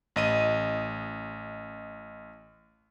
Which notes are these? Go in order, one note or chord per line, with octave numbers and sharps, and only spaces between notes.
A1 D#5 D#7